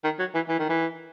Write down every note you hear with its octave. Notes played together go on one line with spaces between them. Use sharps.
D#3
F#3
E3
E3
D#3
E3